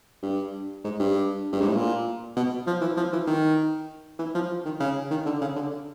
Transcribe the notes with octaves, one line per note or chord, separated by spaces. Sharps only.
G2
G#2
G2
G2
G#2
A2
A#2
B2
F3
E3
F3
E3
D#3
E3
F3
D#3
C#3
D#3
D3
C#3
D3